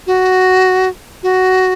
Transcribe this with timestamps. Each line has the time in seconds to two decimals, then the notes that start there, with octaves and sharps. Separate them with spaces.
0.07 F#4
1.23 F#4